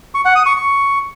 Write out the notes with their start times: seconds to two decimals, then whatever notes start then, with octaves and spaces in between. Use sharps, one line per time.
0.14 C#6
0.25 F#5
0.35 D#6
0.46 C#6
0.56 C#6